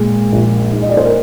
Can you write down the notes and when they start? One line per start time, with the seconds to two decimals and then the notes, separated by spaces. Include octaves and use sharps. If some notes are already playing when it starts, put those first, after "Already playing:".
Already playing: A#2 G#3
0.33 A#1
0.72 D#4
0.82 D#5
0.89 D5
0.97 C5
1.05 A#4